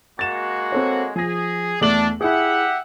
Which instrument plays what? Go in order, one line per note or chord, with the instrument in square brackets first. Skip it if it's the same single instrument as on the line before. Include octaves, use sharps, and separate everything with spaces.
[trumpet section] G#3 A#3 F#4 [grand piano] A6 E7
[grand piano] C4 A4 C#5
[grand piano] F3 A#6 [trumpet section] G#4
[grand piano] E2 A3 F#7 [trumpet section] D4
[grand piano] E4 G#4 [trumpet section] G4 E5 F#5